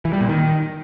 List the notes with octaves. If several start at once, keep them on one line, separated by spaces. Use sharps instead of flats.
E3
G3
A#2
D#3